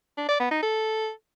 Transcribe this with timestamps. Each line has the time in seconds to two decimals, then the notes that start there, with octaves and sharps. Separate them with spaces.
0.17 D4
0.29 D5
0.40 B3
0.51 D#4
0.62 A4